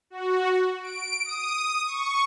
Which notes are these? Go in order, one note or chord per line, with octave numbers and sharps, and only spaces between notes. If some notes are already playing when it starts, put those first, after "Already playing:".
F#4
D7
D#6
C#6